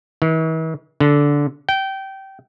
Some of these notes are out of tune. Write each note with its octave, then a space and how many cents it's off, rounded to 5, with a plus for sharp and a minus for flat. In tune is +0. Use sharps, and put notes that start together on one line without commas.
E3 -45
D3 -15
G5 -20